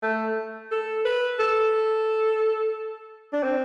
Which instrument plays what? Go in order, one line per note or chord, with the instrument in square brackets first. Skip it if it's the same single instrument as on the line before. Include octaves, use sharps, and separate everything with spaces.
[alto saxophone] A3
A4
B4
A4
D4
C4